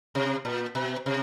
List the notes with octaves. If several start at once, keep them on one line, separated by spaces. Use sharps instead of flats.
C3
A#2
B2
C3